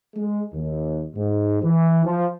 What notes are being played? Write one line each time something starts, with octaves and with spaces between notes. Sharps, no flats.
G#3
D#2
G#2
E3
F3